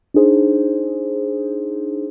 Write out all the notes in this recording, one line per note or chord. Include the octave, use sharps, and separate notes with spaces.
D4 D#4 G#4 C5